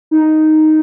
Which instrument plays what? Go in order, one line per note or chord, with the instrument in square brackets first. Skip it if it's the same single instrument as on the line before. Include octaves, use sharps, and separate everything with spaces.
[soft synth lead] D#4